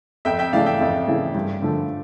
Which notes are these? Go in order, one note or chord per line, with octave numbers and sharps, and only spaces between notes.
F2 E5 G5
E5 G5
C#3 E3 A3 D5 F5
E5 G5
F2
C#3 E3 A3
G2
D3 F3 A3